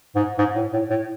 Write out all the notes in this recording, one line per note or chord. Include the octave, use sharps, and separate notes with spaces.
G#2
G#2
A2
A2
A2